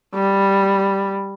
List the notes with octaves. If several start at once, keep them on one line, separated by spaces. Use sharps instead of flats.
G3